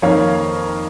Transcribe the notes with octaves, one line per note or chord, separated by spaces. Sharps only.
F2 D#3 A#3 C#5 F5